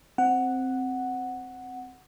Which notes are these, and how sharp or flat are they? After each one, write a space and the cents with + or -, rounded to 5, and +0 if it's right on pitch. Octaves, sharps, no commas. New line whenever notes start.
C4 +0 F#5 +0